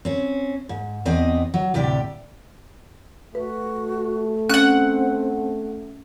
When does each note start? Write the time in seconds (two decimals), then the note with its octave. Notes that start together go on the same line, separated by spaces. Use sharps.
0.05 C4 C#4
0.69 G#2
1.05 E2 B3 C4 D#5
1.54 F#3
1.74 D2 A2 C3 G4 D5
3.35 A3 F#4 B4
4.50 C4 C#4 F#5 F#6